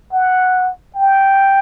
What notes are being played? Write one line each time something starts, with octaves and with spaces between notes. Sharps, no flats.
F#5
G5